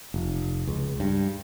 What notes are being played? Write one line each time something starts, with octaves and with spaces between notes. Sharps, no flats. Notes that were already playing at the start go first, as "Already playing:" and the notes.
F1
C#2
G2